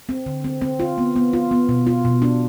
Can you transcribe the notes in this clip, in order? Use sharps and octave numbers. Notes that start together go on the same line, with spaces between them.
C4
D3
C4
C4
F4
B3
B3
F4
B3
B2
F4
B2
D4